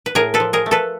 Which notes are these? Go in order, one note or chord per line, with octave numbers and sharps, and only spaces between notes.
B4
A2 G#4 A#4
A4 B4
F3
G#4 A#4
A3
A4 B4